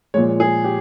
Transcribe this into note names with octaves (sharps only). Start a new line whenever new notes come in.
A#2 F3 G#3 C#5
G#4
G4